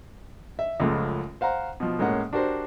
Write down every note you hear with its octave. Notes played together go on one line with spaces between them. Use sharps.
E5
C#2 F#2 C#3 F3 G#3 A3
C5 F5 F#5 A#5
B2 F3
A2 G#3 A#3 C#4 F#5
D4 F#4 G4 A#4 C5